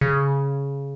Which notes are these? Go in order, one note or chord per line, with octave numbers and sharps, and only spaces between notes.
C#3